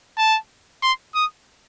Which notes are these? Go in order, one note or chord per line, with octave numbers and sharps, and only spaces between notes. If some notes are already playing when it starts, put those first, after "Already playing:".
A5
C6
D#6